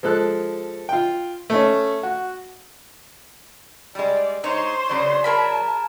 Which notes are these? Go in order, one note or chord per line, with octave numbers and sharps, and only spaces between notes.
F3 G#3 A4 F#6
F4 G5
A3 C#4
F#4
G3 G#3 D5
G#3 D#4 C5 C#5 C6
C#3 F#3 D5
G#4 A#4 A5 B5